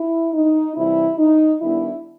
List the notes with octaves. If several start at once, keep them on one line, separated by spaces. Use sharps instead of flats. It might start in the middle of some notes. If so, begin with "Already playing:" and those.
Already playing: E4
D#4
C3 E3 G3 E4
D#4
D#3 G3 B3 D4 E4